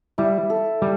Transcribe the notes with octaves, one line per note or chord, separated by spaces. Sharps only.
G3 E4
A4
G3